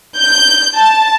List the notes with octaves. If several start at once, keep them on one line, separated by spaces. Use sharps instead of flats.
G6
A5